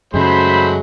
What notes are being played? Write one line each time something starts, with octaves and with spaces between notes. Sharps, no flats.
F#2 C#3 F#3 G#3 A3 C5 B5